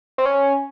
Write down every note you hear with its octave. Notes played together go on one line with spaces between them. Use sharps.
C4
C#4